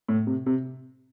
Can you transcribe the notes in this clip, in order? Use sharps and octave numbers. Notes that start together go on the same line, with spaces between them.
A2
C3
C3